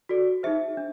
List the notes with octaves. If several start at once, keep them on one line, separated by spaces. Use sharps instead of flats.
F#4 A4 D5
D#4 G#4 C5 E5
D4